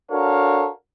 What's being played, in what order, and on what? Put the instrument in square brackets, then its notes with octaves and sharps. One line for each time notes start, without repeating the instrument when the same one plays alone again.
[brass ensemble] D4 F#4 A4 A#4 C#5 F5